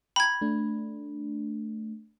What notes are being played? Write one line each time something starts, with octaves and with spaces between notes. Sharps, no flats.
G5 A#5 B5 G#6
A3 D4